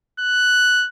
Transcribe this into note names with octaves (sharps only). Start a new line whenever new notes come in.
F#6